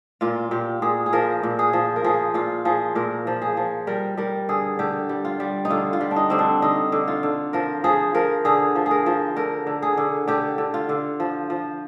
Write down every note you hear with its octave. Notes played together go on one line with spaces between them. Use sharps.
A#2 F4
A#2 G4
A#2 G#4
G#4
F3 A#4
A#2
G#4
F3
A#4
F3 G#4
A#2 F4
F3 G#4
A#2 A#4
F3
G#4
F3
G3 A#4
G3 A#4
D3 G#4
D3 G4
G3
F4
G3
D#4
D3 F4
F4
G3
D4
D#4
D3 C4
D4
D3 D#4
D3
F4
D3
F3 A#4
F3 G#4
F3 A#4
D3 G#4
F3
G#4
A#4
F3
D3 A#4
D3
G#4
D3
D3 G4
D3
F4
D3
F3
F3